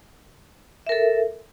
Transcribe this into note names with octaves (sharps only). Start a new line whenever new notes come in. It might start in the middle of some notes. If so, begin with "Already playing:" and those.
A4 A#4 E5